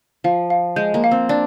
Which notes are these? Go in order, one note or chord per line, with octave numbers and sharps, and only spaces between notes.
F3 F5
F5
G#3 G6
A#3
F5
C4
D4 D5